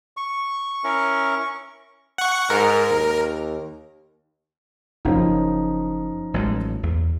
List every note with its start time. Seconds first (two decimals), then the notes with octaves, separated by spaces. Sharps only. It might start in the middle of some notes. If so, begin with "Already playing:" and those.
0.17 C#6
0.84 C#4 E4 A#4
2.18 F#5 C#6
2.50 G#2 A#4
2.91 D#2
5.05 F#1 F3 C#4 D#4
6.34 A1 F#3 G#3
6.83 E2